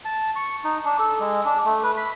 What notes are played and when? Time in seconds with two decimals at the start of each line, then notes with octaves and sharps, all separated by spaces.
0.05 A5
0.36 C#6
0.64 D#4
0.85 D4
0.99 A4
1.20 G#3
1.45 D4
1.65 A3
1.83 B4
1.97 B5